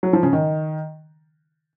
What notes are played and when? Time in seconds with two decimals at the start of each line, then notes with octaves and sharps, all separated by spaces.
0.03 F#3
0.13 F3
0.23 C#3
0.33 D#3